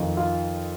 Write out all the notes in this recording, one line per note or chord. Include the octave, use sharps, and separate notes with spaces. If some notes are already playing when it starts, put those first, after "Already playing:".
Already playing: F2 D#3 F4
F4